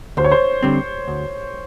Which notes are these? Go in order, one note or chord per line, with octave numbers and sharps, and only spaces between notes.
D2 C5
C#5
C5
D3 G3 C4
D2